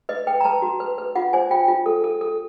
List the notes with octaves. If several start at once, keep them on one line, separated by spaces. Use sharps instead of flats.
B4 D#5
B4 G5
A#5
B4 A5
F#4
B4
B4
F4 F#5
C5 G#5
F4 G5
F4
A4
A4
A4